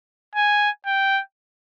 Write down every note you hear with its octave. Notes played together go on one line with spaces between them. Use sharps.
G#5
G5